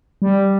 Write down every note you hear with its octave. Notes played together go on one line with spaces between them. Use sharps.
G3